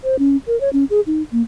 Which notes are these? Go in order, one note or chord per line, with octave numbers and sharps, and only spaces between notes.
C5
C#4
A#4
C#5
C#4
G#4
D#4
A#3